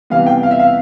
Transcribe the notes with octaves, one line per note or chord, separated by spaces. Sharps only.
C3 E3 G3 B3 F5
G5
F5
E5
F5